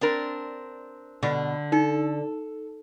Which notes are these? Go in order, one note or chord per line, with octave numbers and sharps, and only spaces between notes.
C4 D4 A#4
B2 D3
D#4 A4